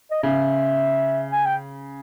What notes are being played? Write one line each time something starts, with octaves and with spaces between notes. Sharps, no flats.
D#5
C#3 E5
G#5
G5